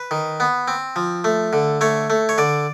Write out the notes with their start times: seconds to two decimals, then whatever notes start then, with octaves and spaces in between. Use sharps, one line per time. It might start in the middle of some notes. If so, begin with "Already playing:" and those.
Already playing: B4
0.11 D#3
0.40 B3
0.68 C4
0.96 F3
1.24 A3
1.53 D3
1.81 A3 C#5
2.10 A3
2.29 C#5
2.38 D3 D5